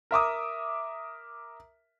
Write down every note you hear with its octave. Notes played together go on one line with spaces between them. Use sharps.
A#4 E5 D6 D#6